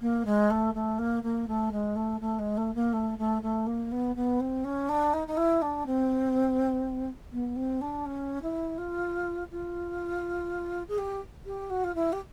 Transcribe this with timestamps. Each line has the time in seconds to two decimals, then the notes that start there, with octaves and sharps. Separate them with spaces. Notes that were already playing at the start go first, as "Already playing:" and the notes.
0.01 A#3
0.25 G#3
0.50 A3
0.74 A3
0.98 A#3
1.23 A#3
1.47 A3
1.71 G#3
1.96 A3
2.20 A3
2.39 G#3
2.57 A3
2.75 A#3
2.93 A3
3.18 A3
3.42 A3
3.66 A#3
3.91 B3
4.15 B3
4.40 C4
4.64 C#4
4.89 D4
5.13 D#4
5.27 D#4
5.37 E4
5.62 D4
5.86 C4
7.32 B3
7.56 C4
7.81 D4
8.06 C#4
8.42 E4
8.78 F4
9.51 F4
10.88 G#4
10.98 G4
11.45 G4
11.70 F#4
11.84 F4
11.95 E4
12.12 G4